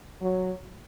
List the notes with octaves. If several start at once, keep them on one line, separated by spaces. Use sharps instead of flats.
F#3